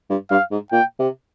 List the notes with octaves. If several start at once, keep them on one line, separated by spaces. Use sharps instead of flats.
G2
G2 F5
G#2
A#2 G5
C3